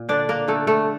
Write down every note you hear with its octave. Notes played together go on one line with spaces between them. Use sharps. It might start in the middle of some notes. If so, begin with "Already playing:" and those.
Already playing: A#2
D3 D4 D5
A#3 A#4
D3 A3 A4
A3 A4